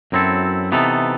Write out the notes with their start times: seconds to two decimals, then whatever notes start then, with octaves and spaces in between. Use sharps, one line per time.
0.12 F#2 F#3 C4 E4 A4
0.72 C3 E3 B3 D#4 A4